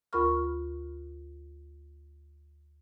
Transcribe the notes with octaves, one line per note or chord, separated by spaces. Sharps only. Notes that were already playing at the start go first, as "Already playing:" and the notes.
D2 F4 A#4 B5 C#6 F6